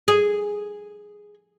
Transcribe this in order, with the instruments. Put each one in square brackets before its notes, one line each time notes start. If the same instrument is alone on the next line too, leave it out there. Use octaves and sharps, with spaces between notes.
[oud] G#4